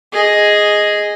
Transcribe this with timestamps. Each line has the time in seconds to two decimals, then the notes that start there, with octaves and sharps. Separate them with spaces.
0.12 G#4 D#5